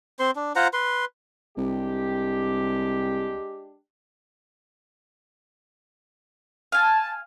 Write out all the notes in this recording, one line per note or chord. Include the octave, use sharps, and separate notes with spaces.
C4 C5 C6
D4
F4 C5 F#5 A#5
B4 C6
C2 G#3 D4 G4
F5 G#5 A5